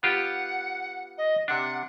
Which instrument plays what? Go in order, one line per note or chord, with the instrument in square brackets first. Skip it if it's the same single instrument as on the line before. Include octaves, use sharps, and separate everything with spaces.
[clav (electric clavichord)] B3 F4 G4 [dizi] F#5
[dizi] D#5
[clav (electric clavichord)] C3 D4 [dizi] F#5